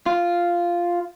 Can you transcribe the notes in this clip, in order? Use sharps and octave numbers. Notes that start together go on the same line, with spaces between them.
F4